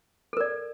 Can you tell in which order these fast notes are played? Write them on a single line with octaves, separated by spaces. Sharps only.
A4 A#4 D5